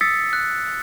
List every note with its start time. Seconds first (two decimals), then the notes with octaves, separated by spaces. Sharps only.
0.01 D#6 E6 A6 B6 C#7
0.33 F#6